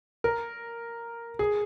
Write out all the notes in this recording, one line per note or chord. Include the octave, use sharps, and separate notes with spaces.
A#4
G#4